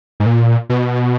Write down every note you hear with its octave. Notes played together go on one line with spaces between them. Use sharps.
G#2
A#2
B2